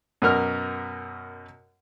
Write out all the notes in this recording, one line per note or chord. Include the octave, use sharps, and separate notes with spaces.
F#2 B2 A#4 F6